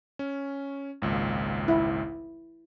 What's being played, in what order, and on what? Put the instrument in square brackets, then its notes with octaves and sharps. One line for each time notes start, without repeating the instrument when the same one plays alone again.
[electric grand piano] C#4
G#1 C#2 A#2
[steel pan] E4